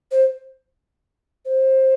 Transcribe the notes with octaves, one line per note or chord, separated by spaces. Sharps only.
C5
C5